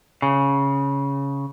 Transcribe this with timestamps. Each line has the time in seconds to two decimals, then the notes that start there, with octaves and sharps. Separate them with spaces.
0.22 C#3